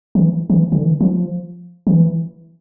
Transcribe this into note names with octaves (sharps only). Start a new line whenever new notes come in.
E3
E3
D3
E3
F3
E3